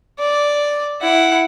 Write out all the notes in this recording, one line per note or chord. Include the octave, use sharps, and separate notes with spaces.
D5
E4 F#5